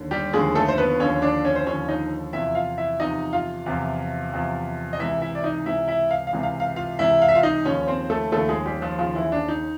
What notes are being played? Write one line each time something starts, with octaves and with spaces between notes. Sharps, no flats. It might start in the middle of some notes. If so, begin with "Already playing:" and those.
Already playing: D#2 D3
G3 G4
D#2 D3 F3 G#3 G#4
A3 A4
C5
B3 B4
D#2 D3 F3 C#4 C#5
D4 D5
C#4 C#5
C5
D#2 D3 F3 C#4 C#5
D#4 D#5
E2 C3 F3 E4 E5
F4 F5
E4 E5
E2 C3 F3 D#4 D#5
F4 F5
E2 C3 F3
E2 C3 F3
D#5
C#2 C3 E3 E4 E5
E4 E5
D5
D#4 D#5
C#2 C3 E3 E4 E5
E4 E5
F5
F5
C#2 C3 E3
F5
F5
F4 F5
C#2 C3 E3 E4 E5
F5
E5
F4 F5
D#4 D#5
D#2 C#3 F3 C#4 C#5
C4 C5
A3 A4
D#2 C#3 F3 A3 A4
G#3 G#4
G3 G4
F3 F4
D#2 C#3 F3 F4
E3 E4
D4
D#4